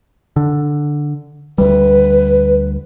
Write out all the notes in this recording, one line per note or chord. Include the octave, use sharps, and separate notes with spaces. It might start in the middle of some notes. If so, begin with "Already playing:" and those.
D3
D2 G3 B4